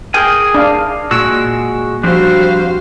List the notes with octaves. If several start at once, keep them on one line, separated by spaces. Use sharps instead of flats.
G#4 A#4 G5 G#5
D4 F5
A#2 G#3 F#4 E6
F3 G3 C4 D4 F#4 C5 F5